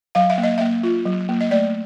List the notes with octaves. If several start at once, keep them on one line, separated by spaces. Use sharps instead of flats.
F#3 F5
E5
A#3
D#5
A#3 E5
F4
F#3
A#3
D#5
A3 D5